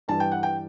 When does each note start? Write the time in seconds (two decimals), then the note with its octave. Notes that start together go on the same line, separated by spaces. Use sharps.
0.08 G2 E3 G3 A5
0.20 G5
0.31 F#5
0.43 G5